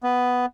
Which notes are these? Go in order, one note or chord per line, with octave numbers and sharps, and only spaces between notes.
B3